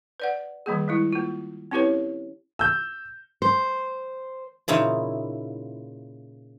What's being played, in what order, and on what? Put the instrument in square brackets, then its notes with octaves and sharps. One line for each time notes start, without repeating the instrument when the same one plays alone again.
[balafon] B4 D5 F#5
D#3 G3 A#3 G#4
G3 G#3 E4
A#3 F4
C4 C#4 E4 G4 B4 C#5
[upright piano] E6 G6
[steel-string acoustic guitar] C5
[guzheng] A#2 C#3 D#4 E4